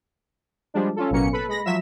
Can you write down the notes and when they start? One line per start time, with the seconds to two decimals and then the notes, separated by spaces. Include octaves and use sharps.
0.74 F3 G3 G#3 D4
0.96 C#4 F4 A4
1.11 A1 B2 F#3 A#3 C#4 C#7
1.33 A4 B4 B5
1.48 G#3 B5 A#6
1.65 F3 F#3 E5 B6 E7